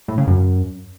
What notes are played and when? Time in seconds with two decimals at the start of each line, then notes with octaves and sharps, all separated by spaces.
0.08 A2
0.18 C#3
0.27 F#2